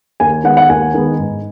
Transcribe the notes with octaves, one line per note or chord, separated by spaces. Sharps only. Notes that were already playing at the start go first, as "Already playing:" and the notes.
D#2 G#5
D#3 G#3 B3 F#5
F#5
D#2 G#5
D#3 G#3 B3
G#2